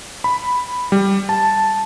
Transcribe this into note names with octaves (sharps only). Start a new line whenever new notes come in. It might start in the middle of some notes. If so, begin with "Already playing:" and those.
B5
G3
A5